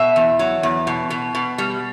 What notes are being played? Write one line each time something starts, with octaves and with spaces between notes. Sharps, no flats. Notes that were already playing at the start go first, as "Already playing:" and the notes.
Already playing: B2 E5
E2
F#3
E2
B2
B2
B2
G3